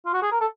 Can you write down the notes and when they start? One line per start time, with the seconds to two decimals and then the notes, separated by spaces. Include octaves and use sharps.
0.06 F4
0.14 F#4
0.22 G#4
0.32 A#4
0.41 A4